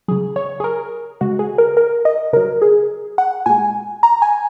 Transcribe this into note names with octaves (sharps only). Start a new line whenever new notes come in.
C#3 F#3 G#4
C#5
G#4
A#4
C#3 G#3 F#4
G#4
A#4
A#4
D#5
C#3 F#3 A#4
G#4
F#5
A#2 G#3 G#5
A#5
G#5